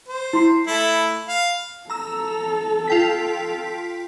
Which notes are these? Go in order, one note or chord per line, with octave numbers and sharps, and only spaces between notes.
C5
E4 C6 C7
A3 E4 A4 B5
F5
A4 A#5 E6
F4 G5 B6